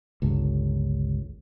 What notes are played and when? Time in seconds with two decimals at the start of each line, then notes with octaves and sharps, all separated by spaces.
0.22 G1 C#2